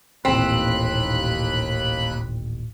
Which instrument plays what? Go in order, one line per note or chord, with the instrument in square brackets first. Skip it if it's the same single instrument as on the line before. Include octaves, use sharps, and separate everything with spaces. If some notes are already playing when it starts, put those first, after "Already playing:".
[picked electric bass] D#1 A1 B2 [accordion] D#2 B5 F#6 [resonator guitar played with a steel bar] C4